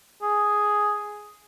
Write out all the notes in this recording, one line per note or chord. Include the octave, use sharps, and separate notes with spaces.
G#4